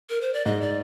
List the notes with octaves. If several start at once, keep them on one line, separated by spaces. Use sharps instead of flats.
A#4
C5
D5
G#2 D#5
D5